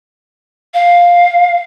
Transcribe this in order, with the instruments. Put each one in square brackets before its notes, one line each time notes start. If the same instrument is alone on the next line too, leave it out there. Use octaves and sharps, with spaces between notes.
[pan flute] F5